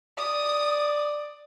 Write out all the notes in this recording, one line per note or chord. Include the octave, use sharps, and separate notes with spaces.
D5 D#6